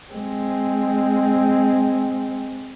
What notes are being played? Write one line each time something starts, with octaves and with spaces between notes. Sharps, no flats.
G#3 C4